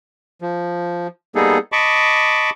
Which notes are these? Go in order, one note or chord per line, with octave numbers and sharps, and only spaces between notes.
F3
G3 A#3 B3 D#4 G#4 A4
D#5 A5 B5 C#6 D6